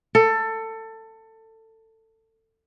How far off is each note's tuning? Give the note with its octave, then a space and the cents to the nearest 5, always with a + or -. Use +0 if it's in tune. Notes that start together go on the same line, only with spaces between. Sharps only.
A4 +20